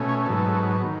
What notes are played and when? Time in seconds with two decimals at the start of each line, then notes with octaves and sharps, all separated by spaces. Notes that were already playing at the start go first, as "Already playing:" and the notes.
Already playing: B2 A3 C#4
0.09 C#5
0.26 G#2 F#3 B3 A4
0.84 D#3